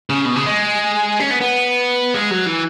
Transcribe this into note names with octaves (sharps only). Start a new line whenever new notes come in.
C#3
B2
C#3
G#3
C#4
B3
B3
G#3
F#3
E3